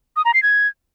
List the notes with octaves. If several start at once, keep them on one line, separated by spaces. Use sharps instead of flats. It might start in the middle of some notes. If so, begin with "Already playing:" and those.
D#6
A#5
C7
G#6